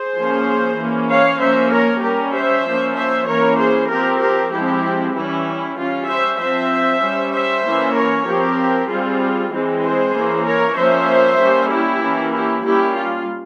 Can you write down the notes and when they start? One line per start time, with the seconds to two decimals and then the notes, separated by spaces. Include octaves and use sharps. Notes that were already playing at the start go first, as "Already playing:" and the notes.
Already playing: G#4 C5
0.17 F3 A#3 C#4
0.79 E3 A#3 C#4
1.11 C#5 F5
1.41 F3 A#3 C#4 C5 E5
1.73 A#4 C#5
2.04 G3 C#4 G4 A#4
2.35 C5 E5
2.66 F3 A#3 C#4
2.97 C5 E5
3.29 E3 A#3 C#4 A#4 C#5
3.59 G#4 C5
3.91 F3 C4 G4 A#4
4.23 G4 A#4
4.53 F3 G#3 C4 E4 G4
5.16 E3 G3 C#4 E4
5.78 G3 C#4 F4
6.10 C5 E5
6.40 F3 C4 C5 E5
7.03 G3 C#4
7.34 C5 E5
7.66 E3 A#3 C#4
7.96 A#4 C#5
8.27 F3 C4 G4 A#4
8.90 G3 C4 F4 G#4
9.53 E3 G#3 C4
9.84 G#4 C5
10.15 E3 A#3 C#4
10.46 A#4 C#5
10.77 F3 A#3 C#4 C5 E5
11.39 G3 A#3 C#4
11.71 E4 G4
12.02 E3 A#3 C#4
12.33 E4 G4
12.64 G3 A#3 C#4 E4 G4
12.95 F4